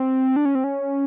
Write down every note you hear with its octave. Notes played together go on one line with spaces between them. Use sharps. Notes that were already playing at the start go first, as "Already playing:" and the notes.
Already playing: C4
D4
C#4
C4
C#4